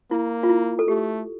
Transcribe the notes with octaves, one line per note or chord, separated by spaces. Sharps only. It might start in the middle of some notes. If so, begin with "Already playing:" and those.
A#3 E4
F4
E4
A4
A3 G4